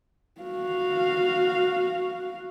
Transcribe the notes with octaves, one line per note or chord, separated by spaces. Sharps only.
F#4 F5